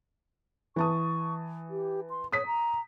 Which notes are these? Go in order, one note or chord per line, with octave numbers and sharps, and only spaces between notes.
E3 A5 C#6 D#6
G4
C6
C#5 D#6 B6
A#5